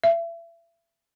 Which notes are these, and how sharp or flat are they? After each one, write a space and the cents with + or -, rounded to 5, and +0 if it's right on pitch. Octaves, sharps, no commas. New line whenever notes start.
E5 +35